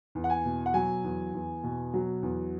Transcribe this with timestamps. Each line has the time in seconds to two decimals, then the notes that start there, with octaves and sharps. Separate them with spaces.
0.15 E2
0.24 F#5
0.30 G#5
0.45 B2
0.66 F#5
0.74 F#3 G#5
1.04 E2
1.34 E2
1.63 B2
1.94 F#3
2.23 E2